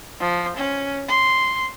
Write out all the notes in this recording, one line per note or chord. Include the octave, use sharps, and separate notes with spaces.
F3
C#4
C6